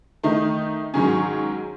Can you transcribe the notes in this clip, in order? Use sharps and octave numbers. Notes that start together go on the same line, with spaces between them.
D#3 A3 D#4
G#2 D#3 F#3 C#4 G#4